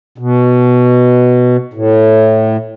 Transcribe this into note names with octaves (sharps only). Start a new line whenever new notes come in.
B2
A2